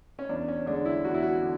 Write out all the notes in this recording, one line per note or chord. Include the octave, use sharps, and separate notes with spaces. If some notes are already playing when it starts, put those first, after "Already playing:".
C#4
E2 D4
C#4
D3 G#3 D4
E4
E2 F#4
E4
F#4
D3